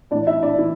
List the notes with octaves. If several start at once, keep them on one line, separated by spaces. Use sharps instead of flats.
A2 E3 D4 D5
E4 E5
D4 D5
E3 E4